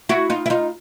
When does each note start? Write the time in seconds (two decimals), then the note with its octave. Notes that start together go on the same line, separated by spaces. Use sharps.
0.09 E4 F#4
0.30 D#4 F4
0.46 E4
0.50 D#4 F4